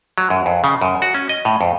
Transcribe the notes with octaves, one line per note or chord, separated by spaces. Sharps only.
F#3
F#2
F2
C#3
F#2
F#4
C#4
D#5
A2
F2